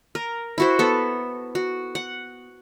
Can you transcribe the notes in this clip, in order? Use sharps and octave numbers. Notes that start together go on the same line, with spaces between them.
A#4
E4 F#4 C5
B3 A4
F#4
F#5